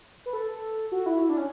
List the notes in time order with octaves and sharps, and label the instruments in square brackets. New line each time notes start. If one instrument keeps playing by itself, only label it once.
[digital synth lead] B4
A4
F#4
E4
E4
D4
C#4